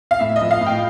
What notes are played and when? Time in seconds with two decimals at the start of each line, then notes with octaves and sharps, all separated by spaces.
0.11 F5
0.20 A2 E5
0.36 D#5
0.41 F3
0.51 F5
0.61 A2
0.67 G5